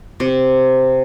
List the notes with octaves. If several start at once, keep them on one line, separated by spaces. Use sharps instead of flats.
C3